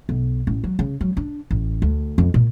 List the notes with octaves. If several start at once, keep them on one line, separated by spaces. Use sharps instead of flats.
B1
A1
F#3
C#3
F#3
D4
A1
D2
F2
A#2